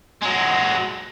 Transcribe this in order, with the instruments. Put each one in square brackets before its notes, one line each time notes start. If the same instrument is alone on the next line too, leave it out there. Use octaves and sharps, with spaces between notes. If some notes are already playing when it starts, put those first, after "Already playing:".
[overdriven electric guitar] F#3 G#3